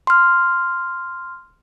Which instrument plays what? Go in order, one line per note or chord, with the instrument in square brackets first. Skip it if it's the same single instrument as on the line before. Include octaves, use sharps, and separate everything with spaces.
[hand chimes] C6 F6